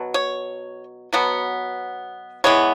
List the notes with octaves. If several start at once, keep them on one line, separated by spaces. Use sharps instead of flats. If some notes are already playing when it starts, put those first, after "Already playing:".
Already playing: B2 F#3
C#5
B2 F#3 B3
E3 G#3 B3 C#5